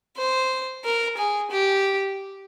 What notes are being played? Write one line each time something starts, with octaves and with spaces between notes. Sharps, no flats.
C5
A#4
G#4
G4